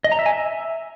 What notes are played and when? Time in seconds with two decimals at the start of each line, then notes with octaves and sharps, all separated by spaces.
0.04 D#5
0.12 A#5
0.19 E5
0.26 G#5
0.33 E5